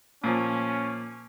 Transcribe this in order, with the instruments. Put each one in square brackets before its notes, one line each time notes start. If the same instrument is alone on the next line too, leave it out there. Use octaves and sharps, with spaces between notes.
[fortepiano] A#2 F3 [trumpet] C#4